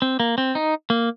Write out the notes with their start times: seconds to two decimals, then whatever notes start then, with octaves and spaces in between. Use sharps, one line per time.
0.02 C4
0.20 A#3
0.38 C4
0.55 D#4
0.90 A#3